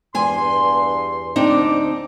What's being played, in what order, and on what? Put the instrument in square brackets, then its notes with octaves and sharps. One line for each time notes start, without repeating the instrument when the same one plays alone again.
[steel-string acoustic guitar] E2 G#5 [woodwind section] G2 C6
[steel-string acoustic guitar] D2 C4 D#4 [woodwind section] D4 D6